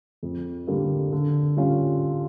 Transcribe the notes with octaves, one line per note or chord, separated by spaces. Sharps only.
F2
D3 G3 A#3
D3
G3 C#4 F4